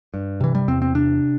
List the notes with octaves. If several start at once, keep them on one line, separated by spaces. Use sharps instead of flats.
G2
C3 E3
G3
E2 C4
C4
C3 D4